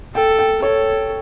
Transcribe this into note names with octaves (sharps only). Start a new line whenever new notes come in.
A4 G5
G5
A4 C#5